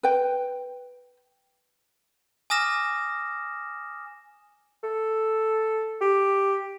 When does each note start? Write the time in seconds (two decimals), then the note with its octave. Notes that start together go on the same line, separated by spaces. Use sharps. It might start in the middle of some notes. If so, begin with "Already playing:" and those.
0.03 B4 G5
2.50 G#5 D6 D#6 F6 A#6 E7
4.83 A4
6.01 G4